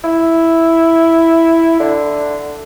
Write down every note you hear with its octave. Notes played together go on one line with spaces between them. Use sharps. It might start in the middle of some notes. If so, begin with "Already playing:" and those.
E4
D3